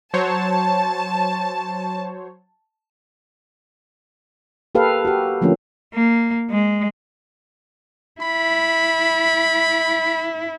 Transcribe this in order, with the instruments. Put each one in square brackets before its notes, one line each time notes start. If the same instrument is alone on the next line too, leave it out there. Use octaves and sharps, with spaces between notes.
[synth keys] F#3 C5 C#5 [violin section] A5
[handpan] A#3 G4 A4 B4 F5
F#4 G4
D3 F3 A3 A#3 C#4
[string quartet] A#3
G#3
[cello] E4 [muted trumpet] B5